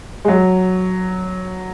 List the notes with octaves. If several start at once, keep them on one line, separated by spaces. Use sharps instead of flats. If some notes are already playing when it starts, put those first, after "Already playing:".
G#3
F#3